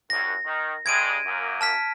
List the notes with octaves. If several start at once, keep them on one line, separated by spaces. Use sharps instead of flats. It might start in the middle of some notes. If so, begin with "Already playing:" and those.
C2 F#2 A#6
D#3
G2 G#3 G#6 D7 D#7
F#2 A#3
A5 F6 B6